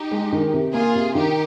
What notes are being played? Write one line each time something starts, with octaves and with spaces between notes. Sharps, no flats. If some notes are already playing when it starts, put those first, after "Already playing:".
Already playing: D#4 G4
G#3
D#3
C3
A#3 F4 G#4
C3
D#3 D#4 G4